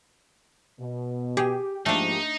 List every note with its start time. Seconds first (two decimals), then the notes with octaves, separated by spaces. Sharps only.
0.80 B2
1.37 G4 G#4
1.86 G#2 F3 A3 A#3 D4 D#4